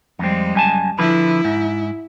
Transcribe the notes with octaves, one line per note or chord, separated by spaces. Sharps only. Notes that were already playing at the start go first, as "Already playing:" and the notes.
F2 G3 G#3 C4
F#2 G#5 A5
D3 F3 E4 B4
G#2